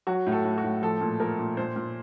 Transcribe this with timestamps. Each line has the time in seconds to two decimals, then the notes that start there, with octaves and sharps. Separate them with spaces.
0.07 F#3 F#4
0.27 A2
0.32 A4
0.45 A2
0.58 F#4
0.64 A2
0.82 F3 A4
1.01 A#2
1.19 F3 A#4
1.39 A#2
1.57 A#2 C5
1.76 A#2